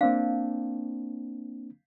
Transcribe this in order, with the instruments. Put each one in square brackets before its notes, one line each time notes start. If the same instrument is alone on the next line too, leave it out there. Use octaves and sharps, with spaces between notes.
[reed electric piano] A#3 C4 D4 [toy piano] F5